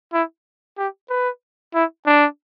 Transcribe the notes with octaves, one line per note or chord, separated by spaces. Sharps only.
E4
G4
B4
E4
D4